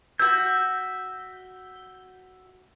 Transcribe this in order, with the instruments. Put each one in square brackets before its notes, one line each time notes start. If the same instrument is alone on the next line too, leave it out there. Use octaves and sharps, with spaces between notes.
[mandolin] F#4 E5 [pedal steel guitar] G6